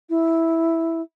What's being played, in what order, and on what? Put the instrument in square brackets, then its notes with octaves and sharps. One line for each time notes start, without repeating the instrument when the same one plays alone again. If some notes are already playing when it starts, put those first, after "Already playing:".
[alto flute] E4